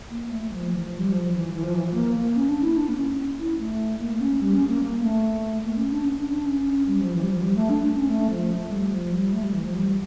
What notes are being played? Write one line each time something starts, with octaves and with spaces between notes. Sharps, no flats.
A#3
A3
F3
E3
F3
G3
F3
E3
E3
F3
E3
F3
A#3
A#3
C#4
D4
E4
D4
A#3
C#4
E4
A3
A#3
C#4
G3
C#4
A#3
A#3
A3
A#3
C#4
D4
C#4
D4
D4
C#4
G3
F3
E3
G3
F3
G3
A3
D4
D4
C#4
A3
F3
A3
G3
F3
G3
A3
G3
E3
F3
G3